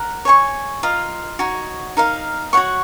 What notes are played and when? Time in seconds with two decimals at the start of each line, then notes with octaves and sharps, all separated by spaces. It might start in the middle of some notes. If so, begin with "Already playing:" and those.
Already playing: A#4 F#5 A#5
0.25 C#5 G#5 C#6
0.83 F4 A#4 D#5
1.39 D#4 F#4 C#5
1.97 D#4 A#4 F5
2.53 F#4 C#5 F#5 C#6